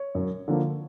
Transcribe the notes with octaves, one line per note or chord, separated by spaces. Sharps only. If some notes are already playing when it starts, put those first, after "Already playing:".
Already playing: C#5
F#2
D3 F3 A#3